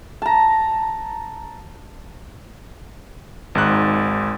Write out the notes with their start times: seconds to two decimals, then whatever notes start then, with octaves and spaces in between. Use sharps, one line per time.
0.22 A5 A#5
3.55 G#1 G#2 F#6